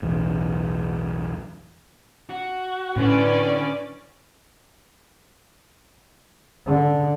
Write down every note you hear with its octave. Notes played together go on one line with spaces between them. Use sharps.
B1 E2 A2
F#4
A2 D3 C#4 E4 B4 D5
D3